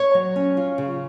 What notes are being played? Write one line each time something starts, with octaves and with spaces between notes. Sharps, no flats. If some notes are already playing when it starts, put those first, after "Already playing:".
Already playing: C#5
F#3
C#4
F4
C#3